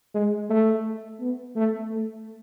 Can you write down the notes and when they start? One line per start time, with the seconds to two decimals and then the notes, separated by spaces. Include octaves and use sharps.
0.14 G#3
0.50 A3
1.20 B3
1.56 A3
1.91 A3